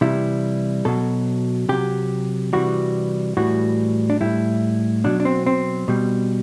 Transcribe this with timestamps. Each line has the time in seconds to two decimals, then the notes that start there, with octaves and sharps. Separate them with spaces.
0.01 C3 E3 G3 E4
0.85 B2 F#3 A4
1.69 C3 F#3 G4
2.53 C3 E3 G3 F#4
3.37 A2 E3 G3 F#4
4.10 D4
4.21 A2 G3 E4
5.04 B2 F#3 D4
5.20 D4
5.25 C4
5.46 C4
5.88 B2 G3